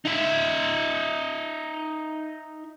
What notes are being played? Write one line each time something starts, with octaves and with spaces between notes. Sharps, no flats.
D#4 E5